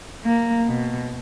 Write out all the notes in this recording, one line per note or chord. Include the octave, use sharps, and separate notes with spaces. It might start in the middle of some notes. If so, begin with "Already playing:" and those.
A#3
B2